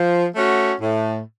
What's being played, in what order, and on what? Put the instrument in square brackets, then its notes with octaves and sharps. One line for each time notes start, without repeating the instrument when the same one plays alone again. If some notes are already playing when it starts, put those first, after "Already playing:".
Already playing: [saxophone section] F3
A3 C#4 F#4
A2